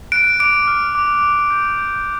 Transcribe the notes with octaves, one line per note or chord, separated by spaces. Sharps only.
F#6 D7
D6 D7
F6
D6
D6
G6
G6